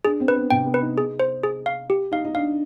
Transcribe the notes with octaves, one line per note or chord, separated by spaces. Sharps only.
D4 G#4
C4
B4
B3
C3 G5
B3
B4
D#4
D#4 G#4
C5
G#4
F5
G4
D#4 F5
D#4
D4 F5